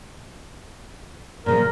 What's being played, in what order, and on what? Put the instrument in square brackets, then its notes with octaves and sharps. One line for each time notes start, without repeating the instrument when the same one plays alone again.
[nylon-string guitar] A#2 C#3 F3 [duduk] A#4